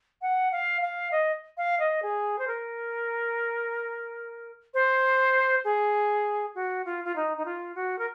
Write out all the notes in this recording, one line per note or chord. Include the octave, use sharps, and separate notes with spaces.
F#5
F5
F5
D#5
F5
D#5
G#4
C5
A#4
C5
G#4
F#4
F4
F4
D#4
D#4
F4
F#4
A#4